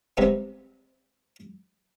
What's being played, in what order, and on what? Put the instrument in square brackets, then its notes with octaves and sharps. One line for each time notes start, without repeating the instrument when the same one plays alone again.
[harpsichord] C3 G3 G#3 B3